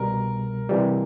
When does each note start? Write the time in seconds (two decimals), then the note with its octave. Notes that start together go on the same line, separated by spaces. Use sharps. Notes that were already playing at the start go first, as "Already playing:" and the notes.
Already playing: C2 B2 G3 A#4
0.69 C3 E3 G3